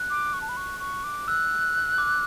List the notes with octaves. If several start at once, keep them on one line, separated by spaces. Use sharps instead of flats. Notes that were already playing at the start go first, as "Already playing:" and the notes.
Already playing: F#6
D6
C#6
A5
B5
C#6
C#6
D6
E6 F#6
D6